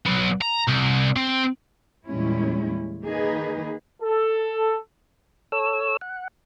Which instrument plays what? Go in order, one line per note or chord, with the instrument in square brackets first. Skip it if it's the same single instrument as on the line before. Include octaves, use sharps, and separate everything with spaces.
[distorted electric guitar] F#3 B3
A#5
C2
C4
[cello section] E2 A#2 G3 G#3 C#4 E4
D#3 A#3 D#4 G#4 B4
[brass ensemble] A4
[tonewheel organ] A4 C#5 E6
F#5